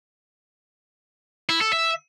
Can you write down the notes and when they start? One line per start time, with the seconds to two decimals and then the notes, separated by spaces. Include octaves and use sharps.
1.49 E4
1.61 A4
1.73 E5